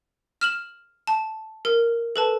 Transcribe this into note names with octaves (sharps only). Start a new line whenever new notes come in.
F6 E7 F#7
A5
A#4
A4 B4 A5